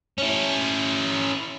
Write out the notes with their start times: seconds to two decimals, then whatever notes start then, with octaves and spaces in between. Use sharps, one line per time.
0.18 C#4 E4